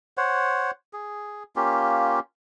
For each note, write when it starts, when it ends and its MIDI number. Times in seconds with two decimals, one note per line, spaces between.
0.17 0.71 72
0.17 0.71 73
0.17 0.71 78
0.93 1.43 68
1.56 2.20 58
1.56 2.20 61
1.56 2.20 65
1.56 2.20 67